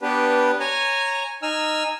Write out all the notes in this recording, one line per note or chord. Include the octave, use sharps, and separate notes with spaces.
B3 D4 G4 B4
C#5 G#5 A#5
D#4 G#5 E6 F6